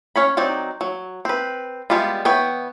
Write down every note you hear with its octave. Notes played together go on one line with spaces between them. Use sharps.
C#4 C#5 B5
F#3 C4 D#4 D5
F#3
C4 B4
G3 G#3 B3 E4 F4
E3 B3 C#5 G5